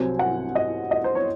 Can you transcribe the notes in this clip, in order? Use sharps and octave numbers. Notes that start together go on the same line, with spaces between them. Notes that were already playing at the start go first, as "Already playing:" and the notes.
Already playing: C2 C3 F#3 C4 G#5
F#5
D#5
D#5
C5
C#5